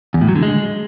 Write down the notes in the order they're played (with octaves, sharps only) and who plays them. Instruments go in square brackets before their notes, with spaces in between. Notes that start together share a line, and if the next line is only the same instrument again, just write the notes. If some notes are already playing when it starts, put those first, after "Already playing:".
[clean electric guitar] E2
A2
F#3
D3
G#3